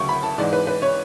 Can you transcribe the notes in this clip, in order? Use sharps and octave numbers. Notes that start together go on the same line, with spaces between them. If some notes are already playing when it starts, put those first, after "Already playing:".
Already playing: D2 C#3 F#3 C#6
B5
A5
G#2 E3 G#3 D5
B4
B4
C#5